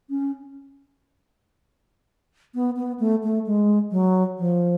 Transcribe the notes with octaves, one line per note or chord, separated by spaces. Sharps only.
C#4
B3
B3
A3
A3
G#3
F#3
F3